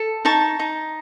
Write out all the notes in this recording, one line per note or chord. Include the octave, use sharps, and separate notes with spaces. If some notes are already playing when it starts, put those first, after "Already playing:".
Already playing: A4
D#4 A5 C#6
D#4